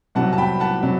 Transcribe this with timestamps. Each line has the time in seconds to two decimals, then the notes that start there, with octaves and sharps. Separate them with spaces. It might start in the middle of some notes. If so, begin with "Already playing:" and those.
0.15 C2 C3 F#3 F#5 A5
0.33 A5
0.38 G5 B5
0.60 F#5 A5
0.83 C3 F#3